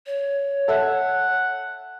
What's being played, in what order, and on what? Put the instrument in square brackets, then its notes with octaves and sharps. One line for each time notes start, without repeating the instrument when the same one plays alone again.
[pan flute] C#5
[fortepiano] A4 E5 [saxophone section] F#5